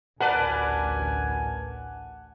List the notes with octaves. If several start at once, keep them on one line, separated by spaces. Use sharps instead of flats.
A1 D2 A#4 B4 D5 F#5 G#5 A5